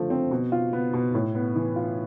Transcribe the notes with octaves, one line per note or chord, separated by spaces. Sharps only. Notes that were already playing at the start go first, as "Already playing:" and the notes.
Already playing: D3 F3 A3
C4
B2
F4
B3
B2
A2
B3
E3
F4